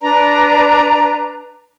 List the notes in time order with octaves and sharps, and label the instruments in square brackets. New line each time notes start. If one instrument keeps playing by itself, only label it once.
[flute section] D4 B4 D5 A#5